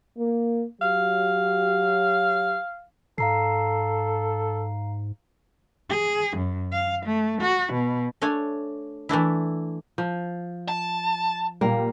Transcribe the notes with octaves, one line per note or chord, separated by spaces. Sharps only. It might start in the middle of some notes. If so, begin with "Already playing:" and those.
A#3
F#3 G4 F5
G#2 A4 F5 A#5 C7
G#4
F#2
F5
A3
F#4
B2
A3 D4 C#5 G#5
E3 A3 D4 E4
F3
A5
A#2 G3 A#3